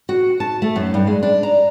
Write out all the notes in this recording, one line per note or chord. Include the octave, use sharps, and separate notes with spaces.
F#4
A5
A3
F#2
G2
G#3
D4
A#5